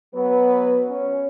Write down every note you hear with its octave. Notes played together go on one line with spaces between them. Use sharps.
F#3 B3 B4
C#4 C#5